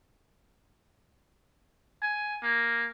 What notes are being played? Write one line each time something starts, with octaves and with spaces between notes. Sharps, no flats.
G#5
A#3